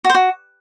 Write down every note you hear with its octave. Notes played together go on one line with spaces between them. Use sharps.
F#4
C5
F#4